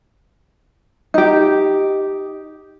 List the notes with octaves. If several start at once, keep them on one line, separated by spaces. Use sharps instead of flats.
D#4 G4